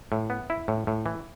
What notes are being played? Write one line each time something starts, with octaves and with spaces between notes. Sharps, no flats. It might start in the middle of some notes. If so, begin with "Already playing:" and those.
A2
B3
E4
A2
A2
E3